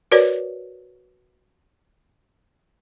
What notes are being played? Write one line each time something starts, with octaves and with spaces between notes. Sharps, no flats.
F#4 A#4 B4 C#5 D5